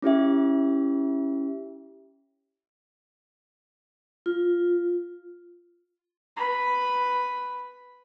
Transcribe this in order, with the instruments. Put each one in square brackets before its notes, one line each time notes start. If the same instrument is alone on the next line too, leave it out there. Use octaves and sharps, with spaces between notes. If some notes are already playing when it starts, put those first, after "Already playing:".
[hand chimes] C#4 E4 G4 E5
[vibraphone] F4
[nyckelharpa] B4 B5